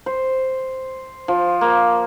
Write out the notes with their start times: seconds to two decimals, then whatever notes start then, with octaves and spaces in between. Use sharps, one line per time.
0.06 C5
1.28 F3
1.61 A#3